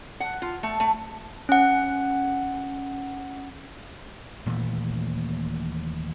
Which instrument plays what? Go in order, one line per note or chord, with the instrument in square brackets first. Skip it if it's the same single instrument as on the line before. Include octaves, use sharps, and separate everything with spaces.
[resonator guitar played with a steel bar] F#5
F4
A3
A3
[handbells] C#4 F#5
[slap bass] D#1 A#2 E3 A3